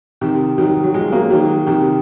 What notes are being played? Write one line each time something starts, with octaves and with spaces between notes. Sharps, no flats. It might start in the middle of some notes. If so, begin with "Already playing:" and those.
C3 D#3
D#3 F#3
F#3
F3 G#3
F#3 A#3
D#3 F#3
C3 D#3